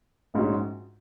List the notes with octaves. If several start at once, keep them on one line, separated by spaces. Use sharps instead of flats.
A#1 G#2 G#3 C#4 F#4